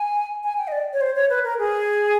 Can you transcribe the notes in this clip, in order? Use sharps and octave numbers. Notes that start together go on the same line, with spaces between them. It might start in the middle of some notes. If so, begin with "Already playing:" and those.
Already playing: G#5
G#5
G5
D#5
D5
C#5
C5
C#5
B4
A#4
G#4